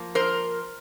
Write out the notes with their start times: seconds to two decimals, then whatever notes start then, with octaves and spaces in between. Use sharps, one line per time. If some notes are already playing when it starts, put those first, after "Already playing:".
Already playing: F3 A#3
0.15 A#4 C5